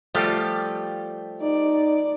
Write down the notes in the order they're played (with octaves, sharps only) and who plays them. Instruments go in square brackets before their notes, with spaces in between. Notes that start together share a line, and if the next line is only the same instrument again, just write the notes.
[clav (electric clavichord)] F3 G3 [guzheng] A3 G4 A4
[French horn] D#4 [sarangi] D5